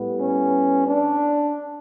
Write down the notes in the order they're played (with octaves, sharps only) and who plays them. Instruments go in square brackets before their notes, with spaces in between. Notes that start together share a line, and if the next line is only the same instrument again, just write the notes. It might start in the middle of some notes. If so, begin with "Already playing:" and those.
Already playing: [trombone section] A2 G3 B3
C#4
D4